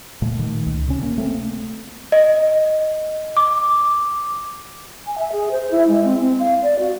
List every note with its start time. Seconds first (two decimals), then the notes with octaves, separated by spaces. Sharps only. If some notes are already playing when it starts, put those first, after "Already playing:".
0.22 A#2 A3
0.39 D#3
0.66 C#2
0.88 C3 C#4
1.03 A#3
1.18 A3 C4
2.12 D#5
3.37 D6
5.06 G#5
5.18 E5
5.32 G#4
5.51 C5
5.71 E4
5.87 G#3
6.04 C4
6.20 C4
6.39 F5
6.63 D5
6.79 F#4